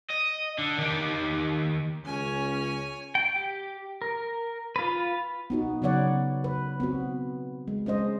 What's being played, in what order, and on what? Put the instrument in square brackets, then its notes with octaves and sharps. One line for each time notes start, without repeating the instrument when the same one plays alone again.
[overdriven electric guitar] D#5
D3
D#3 G4
[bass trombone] C#2 [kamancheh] C#4 [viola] C#5 G#5
[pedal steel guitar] G5
G4
A#4
F4 B4
[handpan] B3 D#4 F#4
C#3 F#3 B3 C#5 D5 F#5
B4
B3 C4 F#4
G#3
G#3 C#4 C5 D#5